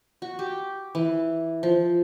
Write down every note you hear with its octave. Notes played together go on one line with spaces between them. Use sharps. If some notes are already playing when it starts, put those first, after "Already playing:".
F#4
G4
E3
F3